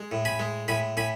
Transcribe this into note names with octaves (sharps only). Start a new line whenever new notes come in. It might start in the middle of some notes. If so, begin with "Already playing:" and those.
Already playing: G#3
A2
G#5 B5
G#3
A2 G#5 B5
A2 G#5 B5